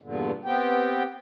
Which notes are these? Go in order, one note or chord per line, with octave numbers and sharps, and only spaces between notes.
E2 G2 A#2 D3
B3 C4 G4 G5